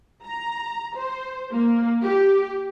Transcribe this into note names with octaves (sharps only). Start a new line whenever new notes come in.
A#5
C5
A#3
G4